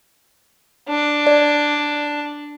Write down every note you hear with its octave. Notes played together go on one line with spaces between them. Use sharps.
D4
D5